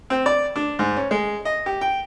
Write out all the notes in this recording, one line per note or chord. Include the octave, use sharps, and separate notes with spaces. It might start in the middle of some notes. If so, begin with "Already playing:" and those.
C4
D5
D4
G#2
C#4
G#3
D#5
G4
G5